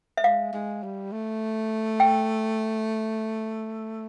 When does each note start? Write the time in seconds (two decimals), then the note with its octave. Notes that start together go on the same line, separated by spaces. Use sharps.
0.17 E5
0.24 G#3 F5
0.53 G#3
0.83 G3
1.12 A3
2.00 G5